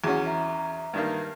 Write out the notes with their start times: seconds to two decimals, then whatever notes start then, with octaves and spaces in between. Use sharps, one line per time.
0.04 E2 F#3 C#4 G#4 F#5
0.26 E5 A#5
0.93 G2 D#3 A#3